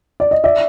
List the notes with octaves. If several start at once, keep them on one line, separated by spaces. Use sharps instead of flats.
D5
D#5
D5 E5